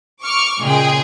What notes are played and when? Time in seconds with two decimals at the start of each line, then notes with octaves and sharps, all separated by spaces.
0.23 C#6 D6 F6
0.63 A#2 C#3 G#3 G#4 G5